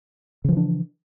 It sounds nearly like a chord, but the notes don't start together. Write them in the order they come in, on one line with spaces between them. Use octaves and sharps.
C#3 F3 E3 D4